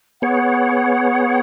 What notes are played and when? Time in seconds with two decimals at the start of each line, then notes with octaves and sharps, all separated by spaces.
0.22 B3 G#4 C#5 F#5